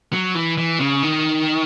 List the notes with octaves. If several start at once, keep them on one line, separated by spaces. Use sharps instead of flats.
F#3
E3
E3
C#3
D#3